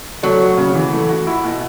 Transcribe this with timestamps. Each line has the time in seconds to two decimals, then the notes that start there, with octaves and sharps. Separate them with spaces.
0.23 F#3 A3
0.41 F#4
0.58 C#3
0.75 E3
0.92 A3
1.09 F#4
1.27 E4
1.44 B2